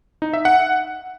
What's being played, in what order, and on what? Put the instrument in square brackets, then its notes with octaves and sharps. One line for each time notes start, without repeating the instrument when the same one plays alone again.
[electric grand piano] D#4
E5
F#5